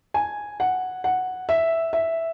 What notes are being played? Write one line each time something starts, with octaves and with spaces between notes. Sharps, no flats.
G#5
F#5
F#5
E5
E5